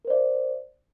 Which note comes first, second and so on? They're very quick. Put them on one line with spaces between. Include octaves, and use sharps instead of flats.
A#4 C5 D5 E5